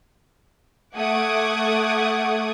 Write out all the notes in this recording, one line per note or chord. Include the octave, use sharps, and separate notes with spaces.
A3 F#5 D6 D#6 G#6